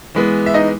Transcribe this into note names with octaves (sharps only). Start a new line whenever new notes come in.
E3 G#3 B3
E5
D#4 D#5